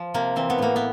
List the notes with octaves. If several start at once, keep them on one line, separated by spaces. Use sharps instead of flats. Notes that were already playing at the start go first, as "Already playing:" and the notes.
Already playing: F3
C3 A#3
E3 C4
B3
A2 A#3
B3